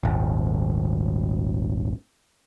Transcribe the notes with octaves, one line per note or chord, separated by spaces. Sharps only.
D#1 G#1